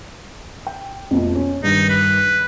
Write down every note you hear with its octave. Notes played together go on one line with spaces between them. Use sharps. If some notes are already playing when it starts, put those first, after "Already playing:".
G5
F2 B2 A3
C#4
G2 D#3 D#4
B4